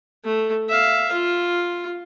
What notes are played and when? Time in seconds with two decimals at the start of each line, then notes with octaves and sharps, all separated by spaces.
0.24 A3
0.69 E5 F5
1.12 F4